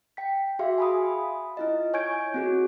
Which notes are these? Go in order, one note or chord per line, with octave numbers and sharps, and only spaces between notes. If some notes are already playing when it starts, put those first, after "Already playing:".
G5 B6
F#4 G#4 E5 F5 C6
G#5 B5 D#6
E4 F4 D#5
C#5 G#5 C#6 G6 G#6 D7
C4 F#4 G#4